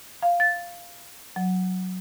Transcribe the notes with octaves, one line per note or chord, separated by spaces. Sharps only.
F5
A6
F#3